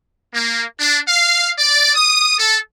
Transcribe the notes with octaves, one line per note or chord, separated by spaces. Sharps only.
A#3
D4
F5
D5
D#6
A4